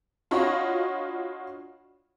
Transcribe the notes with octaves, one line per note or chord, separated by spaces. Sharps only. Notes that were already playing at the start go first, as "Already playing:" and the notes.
D4 F4 F#4 C#5 D#5 B5